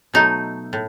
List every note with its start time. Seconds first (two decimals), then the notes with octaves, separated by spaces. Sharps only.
0.14 B2 F#3 A3 D#4
0.73 A2